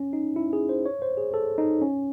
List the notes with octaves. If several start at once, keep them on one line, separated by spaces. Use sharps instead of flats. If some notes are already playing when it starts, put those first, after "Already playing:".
Already playing: C#4
D#4
E4
G#4
C5
C#5
C5
G#4
A4
D#4
C#4